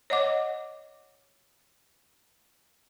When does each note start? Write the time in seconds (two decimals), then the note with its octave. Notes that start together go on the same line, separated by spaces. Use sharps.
0.10 C#5 D#5 F#5 D6